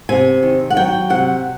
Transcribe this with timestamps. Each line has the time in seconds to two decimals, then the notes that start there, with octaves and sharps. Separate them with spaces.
0.09 C3 G#5
0.43 D#3
0.70 F#5
0.76 F#3 G5
1.10 C3 F#5